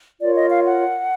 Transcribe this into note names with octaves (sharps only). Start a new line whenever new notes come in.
F4 A#4 C#5 D5
D#5
F5
F#5